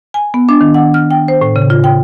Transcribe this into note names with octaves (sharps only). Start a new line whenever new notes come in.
G#5
B3
D4
D#3
F#5
F6
G5
C5
A2
C#3
F4
G5